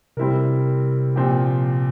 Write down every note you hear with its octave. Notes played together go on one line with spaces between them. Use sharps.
C3 G3 C4 E4 A#4
A#2 F3 C4 G4